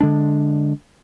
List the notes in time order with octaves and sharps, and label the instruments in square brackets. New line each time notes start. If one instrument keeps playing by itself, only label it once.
[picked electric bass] D3 G#3 D4